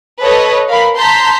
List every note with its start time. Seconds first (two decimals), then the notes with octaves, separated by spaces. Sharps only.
0.22 A4 B4 C#5 D#5
0.68 A#4 F5 B5
0.98 A5 A#5 C6 G6 B6